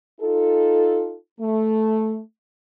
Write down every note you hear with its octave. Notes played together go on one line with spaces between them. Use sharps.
D#4 F4 A4
A3